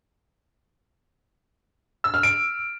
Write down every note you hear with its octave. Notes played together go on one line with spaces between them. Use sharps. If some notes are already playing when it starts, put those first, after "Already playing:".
E6
F6
D7